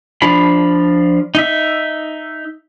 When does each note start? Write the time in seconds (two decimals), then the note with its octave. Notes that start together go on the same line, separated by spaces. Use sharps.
0.22 F3 D4 F4 B5
1.35 D#4 E5